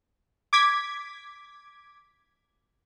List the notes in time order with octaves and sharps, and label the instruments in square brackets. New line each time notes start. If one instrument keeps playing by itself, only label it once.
[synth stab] D6 G#6 B6